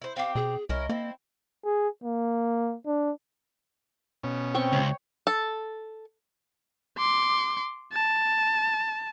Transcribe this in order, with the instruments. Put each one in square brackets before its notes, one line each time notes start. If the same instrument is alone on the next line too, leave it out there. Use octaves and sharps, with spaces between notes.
[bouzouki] E4 C5
[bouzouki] C4 G4 [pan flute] F5
[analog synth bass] B2 [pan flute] G#4
[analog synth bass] C2 [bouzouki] C#4 E4 A#4 [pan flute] D#5
[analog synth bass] A#3 [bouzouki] C4 E4
[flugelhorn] G#4
A#3
D4
[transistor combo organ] B2 C#4
[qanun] C4 G5 C#6
[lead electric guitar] C#2 [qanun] C#5
[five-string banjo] A4
[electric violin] C6 D6
A5